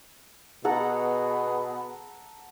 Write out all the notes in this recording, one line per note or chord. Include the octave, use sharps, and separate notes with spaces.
B2 B3 G#4 A4 F#5 A#5